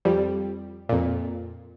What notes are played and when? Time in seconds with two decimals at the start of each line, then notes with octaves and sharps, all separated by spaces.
0.05 F2 G3
0.89 F2 A#2